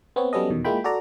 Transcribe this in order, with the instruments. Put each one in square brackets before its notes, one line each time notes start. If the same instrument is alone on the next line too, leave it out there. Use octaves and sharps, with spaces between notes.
[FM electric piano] B3 C4 C#5
F#3 G3 B3 C#4 A4 D#5
E2 B2 D#3
G#3 A#3 E4 F4 G5 B5
F#4 A4 D5 A#5